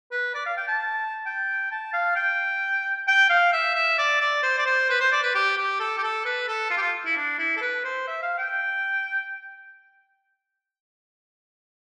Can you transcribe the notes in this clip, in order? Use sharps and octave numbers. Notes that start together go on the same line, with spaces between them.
B4
D5
F5
G5
A5
G5
A5
F5
G5
G5
F5
E5
E5
D5
D5
C5
D5
C5
B4
C5
D5
B4
G4
G4
A4
G4
A4
B4
A4
F4
G4
F4
E4
D4
E4
A4
B4
C5
E5
F5
G5